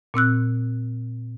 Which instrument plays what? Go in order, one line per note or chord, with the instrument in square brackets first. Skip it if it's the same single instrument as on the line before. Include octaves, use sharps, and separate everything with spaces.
[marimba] A#2 C4 E6 F#6